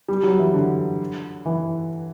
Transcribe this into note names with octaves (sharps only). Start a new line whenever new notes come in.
G3
F#3
E3
D3
E3